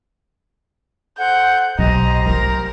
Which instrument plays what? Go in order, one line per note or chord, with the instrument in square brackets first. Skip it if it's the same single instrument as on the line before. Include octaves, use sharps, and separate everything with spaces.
[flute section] A4 C5 F#5 [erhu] G6
[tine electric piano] B1 [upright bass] B2 [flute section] G4 C5 A#5 [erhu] D#5
[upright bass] F#3 A3 [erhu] A#4